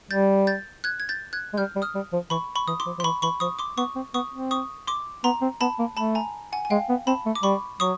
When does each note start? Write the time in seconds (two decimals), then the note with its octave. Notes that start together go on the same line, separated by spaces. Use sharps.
0.11 G3 G6 A6
0.47 G6 A6
0.84 F#6 G#6
1.00 G#6
1.09 G6 A6
1.33 F#6 G#6
1.53 G#3
1.57 G3 F6 G6
1.76 G3
1.82 D#6 F6
1.95 G3
2.13 F3
2.30 E3 B5 C#6
2.55 B5 C#6
2.68 E3 D#6
2.80 C6 D6
2.86 F3
2.98 F3 C6
3.04 E3 B5 C#6
3.22 E3 B5 C#6
3.40 F3 C#6 D#6
3.59 C6 D6
3.77 B3 C#6 D#6
3.95 C4
4.14 B3 C#6 D#6
4.33 C4
4.51 C#6 D#6
4.87 C6 D6
5.24 B3 A#5 C6
5.42 C4
5.61 B3 A5 B5
5.79 A#3
5.97 A3 A5 B5
6.15 G#5 A#5
6.52 F#5 G#5
6.65 G#5
6.70 G#3 F5 G5
6.89 B3
7.07 C4 A5 B5
7.26 A3
7.35 D6
7.43 G3 B5 C#6
7.80 F#3 C#6 D#6